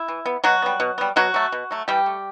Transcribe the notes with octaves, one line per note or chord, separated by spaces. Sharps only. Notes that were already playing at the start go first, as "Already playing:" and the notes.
Already playing: E4
E3
B3
B2 F#3 F#4
G3 B3
B2
G3 B3
B2 F#3 F#4
F#3 A3
B2
F#3 A3
E3 G3 G4
A3